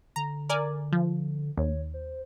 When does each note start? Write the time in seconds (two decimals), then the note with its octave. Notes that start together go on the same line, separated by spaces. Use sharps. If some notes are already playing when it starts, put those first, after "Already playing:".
0.16 D3 A#5
0.49 A#4 D5 G#5
0.92 F3
1.57 D#2 C#5
1.94 C5